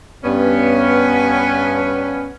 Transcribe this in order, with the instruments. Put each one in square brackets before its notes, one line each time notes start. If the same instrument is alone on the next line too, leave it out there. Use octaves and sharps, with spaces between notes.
[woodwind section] G2 [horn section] B3 C#4